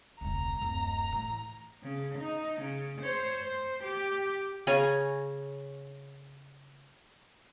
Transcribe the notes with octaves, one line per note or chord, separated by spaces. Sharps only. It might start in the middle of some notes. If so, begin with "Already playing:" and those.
E1 C#2 A#5
D1 F#2
A2 E3
C#3
D#4
C#3
C5 C#5
C5
G4
C#3 C#4 G#5 A#5